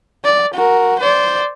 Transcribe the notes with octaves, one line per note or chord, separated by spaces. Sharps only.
D5
F#4 A#4
C5 D5